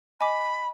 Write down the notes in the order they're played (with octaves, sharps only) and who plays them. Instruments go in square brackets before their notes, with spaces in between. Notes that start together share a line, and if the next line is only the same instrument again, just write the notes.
[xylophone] D#5 G#5 D6 [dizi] B5